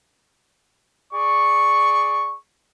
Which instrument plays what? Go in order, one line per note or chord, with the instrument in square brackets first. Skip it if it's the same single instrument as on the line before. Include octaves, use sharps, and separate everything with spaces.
[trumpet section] G#4 D5 C#6